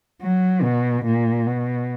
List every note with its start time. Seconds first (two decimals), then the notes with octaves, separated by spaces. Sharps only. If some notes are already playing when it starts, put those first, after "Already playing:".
0.22 F#3
0.63 B2
1.05 A#2
1.47 B2